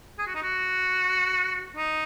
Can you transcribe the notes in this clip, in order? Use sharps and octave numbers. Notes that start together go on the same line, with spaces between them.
G#4
F#4
D#4
F#4
D#4